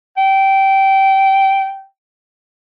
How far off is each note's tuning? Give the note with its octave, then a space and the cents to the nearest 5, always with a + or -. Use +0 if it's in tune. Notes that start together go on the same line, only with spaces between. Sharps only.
G5 -15